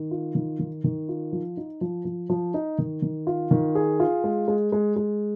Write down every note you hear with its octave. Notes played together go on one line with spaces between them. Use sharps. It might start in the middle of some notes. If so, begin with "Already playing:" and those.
Already playing: D#3
F4
D#3
D#3
D#3
F4
F3
D#4
F3
F3
F3
D#4
D#3
D#3
F4
D#3
G#4
F4
G#3
G#3
G#3
G#3